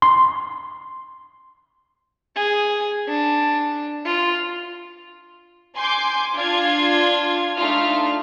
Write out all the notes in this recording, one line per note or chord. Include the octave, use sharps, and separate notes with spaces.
C6
G#4
D4
F4
G#5 C6 D6 G6
D4 F4 G#6
A3 D4 D#4 F4 F6